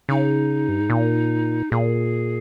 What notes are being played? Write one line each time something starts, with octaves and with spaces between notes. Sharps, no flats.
C#3 D#4
G2
G#2
A#2
A#2 G#4